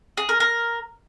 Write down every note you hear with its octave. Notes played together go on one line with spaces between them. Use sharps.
G#4
A#4
A#4